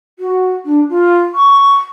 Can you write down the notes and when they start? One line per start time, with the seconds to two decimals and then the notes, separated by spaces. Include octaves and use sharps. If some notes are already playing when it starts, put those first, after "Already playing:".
0.19 F#4
0.65 D4
0.89 F4
1.35 C#6